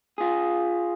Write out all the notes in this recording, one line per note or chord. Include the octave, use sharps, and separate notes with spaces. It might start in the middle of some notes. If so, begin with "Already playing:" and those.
F4 G#4